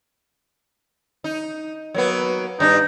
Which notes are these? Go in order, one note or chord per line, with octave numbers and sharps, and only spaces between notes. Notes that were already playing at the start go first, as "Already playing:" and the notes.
D#4
F#3 A#3 B3
G2 D4 D#4